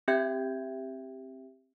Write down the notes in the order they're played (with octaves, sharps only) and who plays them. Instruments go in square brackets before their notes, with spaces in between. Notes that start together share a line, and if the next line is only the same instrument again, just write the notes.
[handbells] C4 G4 E5 G5 G6 G#6